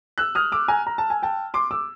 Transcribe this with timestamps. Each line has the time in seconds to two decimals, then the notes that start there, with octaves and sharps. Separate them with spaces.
0.18 E6 F#6
0.35 D#6 F6
0.52 D6 E6
0.68 G#5 A#5
0.87 A#5
0.98 A5
1.10 G#5
1.23 G5 A5
1.54 C6 D6
1.71 D6 E6